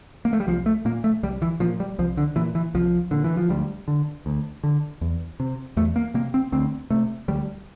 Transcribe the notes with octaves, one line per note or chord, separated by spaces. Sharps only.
A#3
A3
G3
C2 F3
A3
A#2 A#3
A3
C2 G3
E3
A#2 F3
G3
C2 F3
D3
A#2 E3
E3
C2 F3
A#2 D3
E3
F3
D2 G3
D3
D2
D3
E2
C3
E2 A3
A#3
C3 A#3
C4
D2 C4
C3 A3
D2 G3